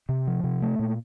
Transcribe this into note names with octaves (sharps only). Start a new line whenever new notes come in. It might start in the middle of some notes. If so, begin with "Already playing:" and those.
C3
F3
C3
A3
A#2